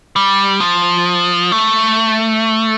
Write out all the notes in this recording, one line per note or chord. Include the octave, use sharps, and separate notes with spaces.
G3
F3
A3